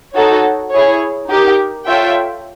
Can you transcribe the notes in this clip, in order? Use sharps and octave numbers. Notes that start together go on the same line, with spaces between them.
D#4 F#4 A4 C#5
E4 G#4 C#5
D#4 G4 A#4
F4 A4 C#5 E5 G5